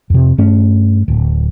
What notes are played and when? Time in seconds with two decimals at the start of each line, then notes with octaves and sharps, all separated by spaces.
0.10 F2 C3
0.38 G2 A3 C#4
1.08 D1